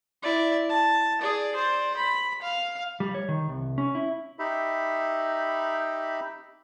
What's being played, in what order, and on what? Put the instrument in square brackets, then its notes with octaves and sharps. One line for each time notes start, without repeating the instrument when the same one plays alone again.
[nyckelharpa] E4 D5
A5
G#4 D5
C5 D5
B5
F5
[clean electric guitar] G3
C#5
D#3
C2
C#4
E4
[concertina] D#4 G4 E5 B5